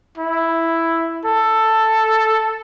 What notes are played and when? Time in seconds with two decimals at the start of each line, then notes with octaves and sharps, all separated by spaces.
0.18 E4
1.25 A4